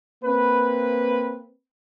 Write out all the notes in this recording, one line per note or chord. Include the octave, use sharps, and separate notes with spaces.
A#3 C4 B4